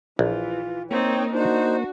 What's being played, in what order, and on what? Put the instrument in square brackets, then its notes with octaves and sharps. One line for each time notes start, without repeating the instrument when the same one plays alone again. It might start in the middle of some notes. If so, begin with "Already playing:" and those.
[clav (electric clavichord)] A#1 [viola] E3 [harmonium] F4
[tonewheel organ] A#3 [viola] C4 D#4 [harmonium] C#5 G5
[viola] D4 F#4 [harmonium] D#4 C5